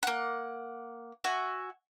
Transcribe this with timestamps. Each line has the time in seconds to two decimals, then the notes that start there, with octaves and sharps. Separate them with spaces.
0.03 A#3 F#5
1.24 F#4 E5 G#5